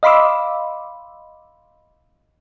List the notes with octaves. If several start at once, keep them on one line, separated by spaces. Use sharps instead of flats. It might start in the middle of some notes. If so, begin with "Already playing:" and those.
D#5 F5 B5 C6 D6 E6